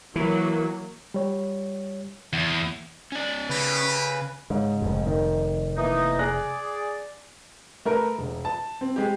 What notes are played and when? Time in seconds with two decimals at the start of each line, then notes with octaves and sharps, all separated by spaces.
0.16 E3 F#3 A#3
1.14 G3 C#5
2.33 E2
3.12 C#4 D5
3.50 C#3 A#3 E4 G4 B4
4.50 G#2 C#3
4.82 F1 F2
5.06 D#3
5.77 E3 A#3 D#4
6.19 G#4 D5 F#6 A#6
7.85 A3 A#4 B4
8.19 E1
8.45 A5
8.81 C4
8.96 G#3 G4